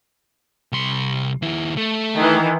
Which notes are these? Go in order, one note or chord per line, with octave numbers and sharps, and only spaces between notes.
C2 C6
D#2 E4
A3
D#3 E3